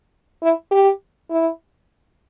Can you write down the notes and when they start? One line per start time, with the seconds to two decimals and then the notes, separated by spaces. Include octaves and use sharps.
0.43 E4
0.71 G4
1.30 E4